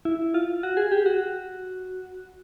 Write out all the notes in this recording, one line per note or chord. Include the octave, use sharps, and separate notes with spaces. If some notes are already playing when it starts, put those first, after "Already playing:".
E4
F4
F#4
G#4
G4
F#4